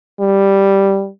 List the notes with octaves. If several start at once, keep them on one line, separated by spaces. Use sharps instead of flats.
G3